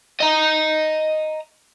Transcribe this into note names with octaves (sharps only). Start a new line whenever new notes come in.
D#5 A#5